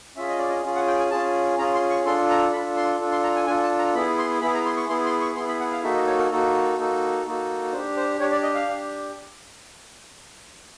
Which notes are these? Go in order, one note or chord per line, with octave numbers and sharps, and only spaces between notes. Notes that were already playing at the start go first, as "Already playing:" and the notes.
C#4 F4 G#4 E5
D#5
D5
D#5
C#4 F4 G#4
F#5
G5
G#5
C#4 F4 G#4 A5
C#4 F4 G#4 A#5
C6
C#6
D4 F4 A4 C6
A#5
D4 F4 A4 B5
C6
D4 F4 A4
C6
A#5
G#5
D4 F4 A4 G#5
A5
A#5
B3 E4 G#4 B5
C6
B3 E4 G#4 B5
A#5
C6
C#6
B3 E4 G#4 C6
C6
C#6
B3 E4 G#4 C6
B5
F#5
F5
A#3 D#4 F#4 A4 E5
D#5
C#5
A#4
A#3 D#4 F#4 A4
A#3 D#4 F#4 A4
A#3 D#4 F#4 A4
D4 G4 C5
C5
D4 G4 C#5
D5
D#5
F5
D4 G4